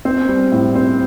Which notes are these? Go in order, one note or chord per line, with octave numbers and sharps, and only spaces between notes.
C4
G3
A2
C4